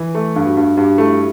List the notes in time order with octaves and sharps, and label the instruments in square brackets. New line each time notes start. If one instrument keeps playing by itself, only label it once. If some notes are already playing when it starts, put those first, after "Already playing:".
Already playing: [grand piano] E3
A3
G2
[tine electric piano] F#4
[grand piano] G2
[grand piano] G2 [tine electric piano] G4
[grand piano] A3 [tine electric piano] E4